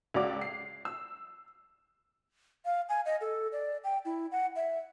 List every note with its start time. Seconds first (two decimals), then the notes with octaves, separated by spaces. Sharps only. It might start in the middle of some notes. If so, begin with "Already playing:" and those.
0.14 C#2 F#4 D5 D6
0.41 C7
0.85 E6
2.65 F5
2.89 G#5
3.06 D#5
3.21 A4
3.52 D5
3.84 G5
4.05 E4
4.32 F#5
4.56 E5